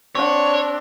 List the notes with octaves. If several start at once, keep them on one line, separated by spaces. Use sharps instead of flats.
C4 D4 C#5 F#5